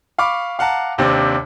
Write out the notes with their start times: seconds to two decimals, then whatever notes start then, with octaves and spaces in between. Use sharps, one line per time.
0.18 F5 B5 C#6 D6
0.59 F5 F#5 A5 A#5
0.98 D#2 C3 C4 D4